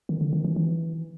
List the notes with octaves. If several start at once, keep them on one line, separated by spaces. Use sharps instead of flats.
D#3
D3
D#3
E3
E3